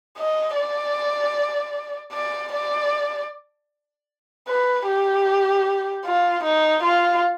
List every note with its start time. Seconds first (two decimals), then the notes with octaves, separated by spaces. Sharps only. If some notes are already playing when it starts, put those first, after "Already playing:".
0.18 D#5
0.56 D5
2.13 D5
2.53 D5
4.48 B4
4.87 G4
6.06 F4
6.44 D#4
6.83 F4